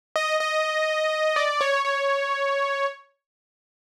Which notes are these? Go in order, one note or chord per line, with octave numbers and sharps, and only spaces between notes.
D#5
D#5
D5
C#5
C#5